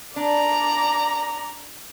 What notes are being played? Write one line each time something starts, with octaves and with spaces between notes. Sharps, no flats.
D4 D5 A#5